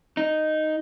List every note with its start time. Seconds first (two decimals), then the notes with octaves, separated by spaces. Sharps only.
0.17 D#4